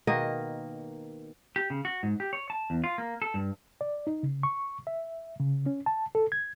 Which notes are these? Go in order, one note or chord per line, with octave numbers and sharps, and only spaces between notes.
B2 D#3 A#3 D#5
G4
C#3
F#4
G#2
G4
C#5
A5
E2
F4
A#3
A4
G2
D5
D#4
C#3
C#6
E5
C#3
C#4
A5
A4
G#6